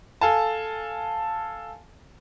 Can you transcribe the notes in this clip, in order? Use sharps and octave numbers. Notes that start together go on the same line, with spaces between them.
A4 F5 G#5 A5